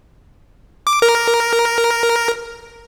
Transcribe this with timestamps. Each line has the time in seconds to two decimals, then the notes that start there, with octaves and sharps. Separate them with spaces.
0.87 D6
1.02 A#4